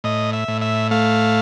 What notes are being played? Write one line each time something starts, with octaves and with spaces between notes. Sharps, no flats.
A2 D#5
E5
A2
E5
A3 F5